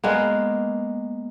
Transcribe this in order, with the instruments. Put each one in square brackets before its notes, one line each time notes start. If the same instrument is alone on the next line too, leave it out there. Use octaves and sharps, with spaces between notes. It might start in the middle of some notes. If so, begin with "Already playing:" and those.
[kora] G#3 A#3 B3